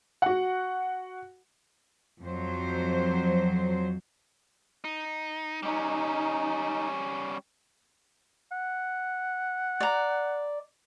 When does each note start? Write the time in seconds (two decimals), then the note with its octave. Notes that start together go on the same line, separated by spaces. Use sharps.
0.22 F#4 F#5
2.22 F2 F#3 C5
4.84 D#4
5.63 G3 C#4 D#4
8.52 F#5
9.80 D5 A#5